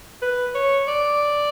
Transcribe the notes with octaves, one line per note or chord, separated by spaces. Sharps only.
B4
C#5
D5